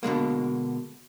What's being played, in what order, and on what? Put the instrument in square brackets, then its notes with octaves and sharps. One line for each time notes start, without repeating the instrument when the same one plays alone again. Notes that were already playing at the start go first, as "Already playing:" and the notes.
[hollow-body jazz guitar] B2 D3 G#3 A#3